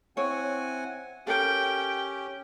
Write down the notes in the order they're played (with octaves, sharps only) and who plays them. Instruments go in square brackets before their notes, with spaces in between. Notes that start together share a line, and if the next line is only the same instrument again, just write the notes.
[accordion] C4 F#5 G#5 [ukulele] E4 C#5
[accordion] C#4 G4 [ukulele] A4 A#4 [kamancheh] G5